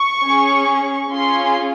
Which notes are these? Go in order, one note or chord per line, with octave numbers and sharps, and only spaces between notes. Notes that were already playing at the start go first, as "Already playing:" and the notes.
Already playing: C#6
C#4 G#4
C#4 F4 G#4 C6